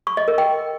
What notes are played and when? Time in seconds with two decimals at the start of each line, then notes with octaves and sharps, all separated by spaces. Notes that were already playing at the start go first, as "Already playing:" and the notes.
0.07 C#6
0.17 D#5
0.28 A#4
0.38 G5